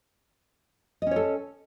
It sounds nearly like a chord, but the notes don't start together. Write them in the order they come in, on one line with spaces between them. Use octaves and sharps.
D#5 C#4 C#5 A4